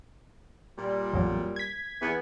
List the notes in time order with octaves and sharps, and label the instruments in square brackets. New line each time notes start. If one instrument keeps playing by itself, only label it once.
[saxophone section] A#2 G3
[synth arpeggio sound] A1 F2 F#3
G#6 B6
[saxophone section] E2 E3 B3